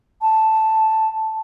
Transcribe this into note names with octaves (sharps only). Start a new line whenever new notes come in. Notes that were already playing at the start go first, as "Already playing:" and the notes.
A5